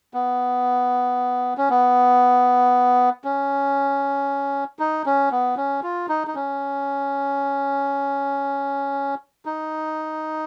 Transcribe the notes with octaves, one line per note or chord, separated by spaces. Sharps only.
B3
C#4
B3
C#4
D#4
C#4
B3
C#4
F4
D#4
D#4
C#4
D#4